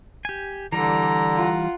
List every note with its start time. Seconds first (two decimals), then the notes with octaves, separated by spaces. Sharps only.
0.25 G4 G#5
0.72 D3 E3 G3 A#5
1.35 F4 F#5